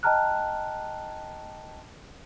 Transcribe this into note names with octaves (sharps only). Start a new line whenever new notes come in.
D#5 G5 A5 A#5 F6 F#6